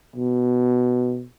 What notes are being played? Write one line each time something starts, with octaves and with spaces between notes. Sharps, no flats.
B2